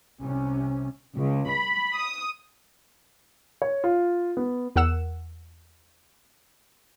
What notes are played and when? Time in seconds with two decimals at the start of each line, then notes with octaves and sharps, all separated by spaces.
0.20 C2 C3 C#4
1.17 C#2
1.49 B5
1.95 D#6
3.62 C#5
3.84 F4
4.37 B3
4.76 E2 A#4 F#5 E6 E7